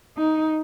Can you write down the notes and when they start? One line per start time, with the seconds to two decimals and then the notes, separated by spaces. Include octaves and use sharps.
0.17 D#4